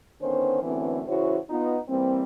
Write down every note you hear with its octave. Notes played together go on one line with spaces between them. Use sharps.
D3 D#3 B3 C#4 C5
F#2 A2 D3 E3 B3 C4
C#3 E3 E4 F#4 C5 C#5
B3 D#4 F4
E3 G3 A#3 C4